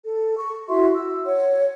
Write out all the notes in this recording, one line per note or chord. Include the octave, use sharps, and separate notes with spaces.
A4
C#6
E4 F#4 E5 C6
E6
C#5 F#5